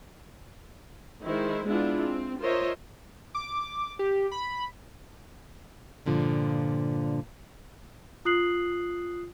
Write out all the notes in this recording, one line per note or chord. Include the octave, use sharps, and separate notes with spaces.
D#3 G#3 E4 C5
G#3 B3 D4 E4 F4
C4
F4 A#4 C5 C#5 D#5 E5
D6
G4
B5
G2 A#2 D3 F3
F4 D#6 F#6 C7 F#7